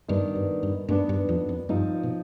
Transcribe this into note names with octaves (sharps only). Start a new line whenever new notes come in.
G2 D#3 B3 D4
G2
G2
G2 D#3 B3 D4
G2
F2
F2
G2 F3 C4 D#4
B2